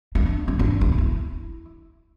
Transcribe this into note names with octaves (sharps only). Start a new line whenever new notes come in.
D4
C#4
D4
E4
E4